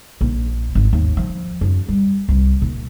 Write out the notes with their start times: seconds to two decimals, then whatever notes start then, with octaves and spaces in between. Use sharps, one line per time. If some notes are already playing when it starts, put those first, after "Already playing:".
0.21 A#1
0.75 G#1
0.93 D#2
1.17 F3
1.61 F#2
1.88 G3
2.29 C2
2.62 A#2